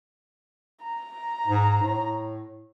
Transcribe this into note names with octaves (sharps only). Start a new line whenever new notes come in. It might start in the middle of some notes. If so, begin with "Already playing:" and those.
A#5
G#2
A2